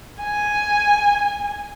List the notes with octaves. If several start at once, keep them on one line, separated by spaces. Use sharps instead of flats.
G#5